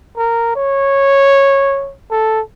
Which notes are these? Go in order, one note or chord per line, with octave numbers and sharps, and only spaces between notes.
A#4
C#5
A4